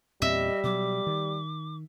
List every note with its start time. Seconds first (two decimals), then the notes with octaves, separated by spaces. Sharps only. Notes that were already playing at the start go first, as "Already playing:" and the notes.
0.22 E2 A#2 G3 C4 D#5 E5
0.64 B2 F#3 D6
1.07 D#3